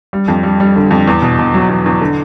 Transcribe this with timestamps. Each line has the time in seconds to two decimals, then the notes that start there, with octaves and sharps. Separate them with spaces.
0.13 G3
0.28 F2
0.43 G3
0.60 G3
0.76 D3
0.91 F2
1.07 E2
1.22 B2
1.39 B2
1.54 F#3
1.69 E2
1.86 E2
2.01 D3